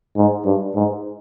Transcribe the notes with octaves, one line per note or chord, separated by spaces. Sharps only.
G#2
G2
G#2